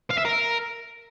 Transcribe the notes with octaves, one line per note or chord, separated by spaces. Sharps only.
F5
E5
A#4